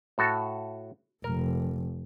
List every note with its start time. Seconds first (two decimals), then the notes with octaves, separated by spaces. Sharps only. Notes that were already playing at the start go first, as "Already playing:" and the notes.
0.18 A2 F#4 A4
1.24 F1 A#4